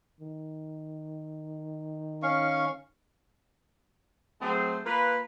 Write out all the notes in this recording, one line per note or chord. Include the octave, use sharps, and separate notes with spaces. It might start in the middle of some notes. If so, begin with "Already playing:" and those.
D#3
C#4 F5 C#6
F#3 A3 C4 G#4 C5
A#3 F4 A#4 B4